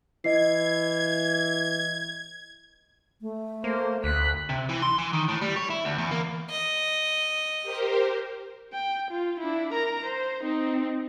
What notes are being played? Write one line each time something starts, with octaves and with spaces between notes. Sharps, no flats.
E3 D#5 G#6 C7
A3
A#3 C5
D2 F#6 B6
C3
E3
C6
E3
D#3
A2
G3
C#5
E4
D2
E2
A#3
D#5
G4 A#4 C5
G5
F4
D4 E4
A#4 A#5
C5
C4 D#4